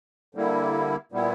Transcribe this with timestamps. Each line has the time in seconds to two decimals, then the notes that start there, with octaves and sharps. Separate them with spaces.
0.35 D3 G3 A#3 E4
1.12 A#2 G3 B3 E4